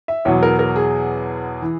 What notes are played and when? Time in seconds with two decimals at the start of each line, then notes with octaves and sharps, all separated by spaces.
0.08 E5
0.25 E2 B2 F#3 C#5
0.43 A#4
0.59 A#4
0.76 G#4
1.62 E3